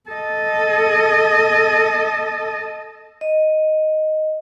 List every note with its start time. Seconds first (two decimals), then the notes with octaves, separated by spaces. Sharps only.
0.10 A4 D#5
3.21 D#5